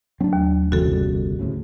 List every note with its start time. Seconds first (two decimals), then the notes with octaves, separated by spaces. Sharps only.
0.20 F#3 A3 C4 D4
0.33 D#2
0.72 G1 C2 C#3 E3 G#3 F#4 A4
0.93 G3
1.39 D2 A2 C#3